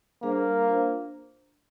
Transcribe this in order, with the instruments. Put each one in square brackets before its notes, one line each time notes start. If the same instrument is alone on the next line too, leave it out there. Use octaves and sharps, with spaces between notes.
[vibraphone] G3 D4 G#4 C5 F5 [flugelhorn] A#3
[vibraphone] D4 F4 C5